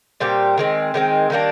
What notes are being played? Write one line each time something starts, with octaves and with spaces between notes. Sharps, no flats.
A#2 G3 C4 G4
D#3 G#3 C4
D#3 G#3 C4
D#3 G3 A#3 D4